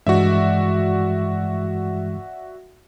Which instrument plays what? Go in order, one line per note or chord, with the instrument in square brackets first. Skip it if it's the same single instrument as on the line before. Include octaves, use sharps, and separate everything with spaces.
[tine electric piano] G2 E3 G#3 [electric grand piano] F#4 D5 E5